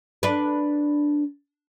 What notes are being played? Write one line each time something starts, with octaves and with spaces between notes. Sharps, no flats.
D4 B4